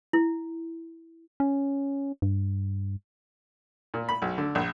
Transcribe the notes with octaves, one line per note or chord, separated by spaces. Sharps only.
E4
C#4
G2
A#2
B5
B1
D3
A#1